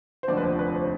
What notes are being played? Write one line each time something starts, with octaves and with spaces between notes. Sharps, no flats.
C5
F1 D#2 D3 F3 D5
B4
C5
B4
C5